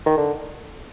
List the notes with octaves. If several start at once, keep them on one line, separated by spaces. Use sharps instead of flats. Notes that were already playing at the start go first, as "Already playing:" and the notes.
D#3
D3